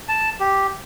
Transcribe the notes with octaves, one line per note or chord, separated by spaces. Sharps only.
A5
G4